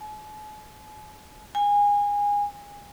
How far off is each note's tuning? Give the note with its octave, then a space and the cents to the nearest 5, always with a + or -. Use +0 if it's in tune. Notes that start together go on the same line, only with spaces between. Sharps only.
G#5 +45
G#5 -25